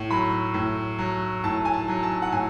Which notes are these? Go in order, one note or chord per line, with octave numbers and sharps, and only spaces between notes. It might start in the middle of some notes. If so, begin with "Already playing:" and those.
Already playing: A2
F#3 B5
A2
F#3
A2 A5
G#5
A5
F#3
A5
F#5
A2 G#5